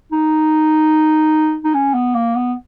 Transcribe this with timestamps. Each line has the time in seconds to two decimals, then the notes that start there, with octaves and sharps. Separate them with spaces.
0.12 D#4
1.64 D#4
1.74 C#4
1.94 B3
2.14 A#3
2.35 B3